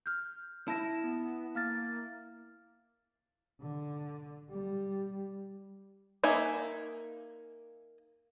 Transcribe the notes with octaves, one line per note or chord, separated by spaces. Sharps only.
F6 G6
E4 A5 A#6 E7
B3
A#3 F5 F6 A6
D3
G3
A#3 D#4 E5 G#5